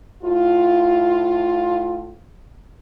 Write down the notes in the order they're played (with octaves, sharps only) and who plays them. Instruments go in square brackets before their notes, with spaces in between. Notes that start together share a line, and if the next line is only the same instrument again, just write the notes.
[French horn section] A2 E4 F4